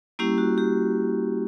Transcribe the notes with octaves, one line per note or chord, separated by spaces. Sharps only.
G3 A#3 C#4 E4 G4
F#4
G4